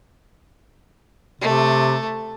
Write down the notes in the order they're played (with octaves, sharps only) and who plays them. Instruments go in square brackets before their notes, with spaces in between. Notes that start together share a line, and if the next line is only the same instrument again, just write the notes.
[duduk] C3 [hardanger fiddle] A3